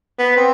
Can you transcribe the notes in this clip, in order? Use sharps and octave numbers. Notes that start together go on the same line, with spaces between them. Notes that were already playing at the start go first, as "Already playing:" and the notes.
B3
C4